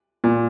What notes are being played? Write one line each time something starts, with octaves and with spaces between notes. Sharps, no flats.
A#2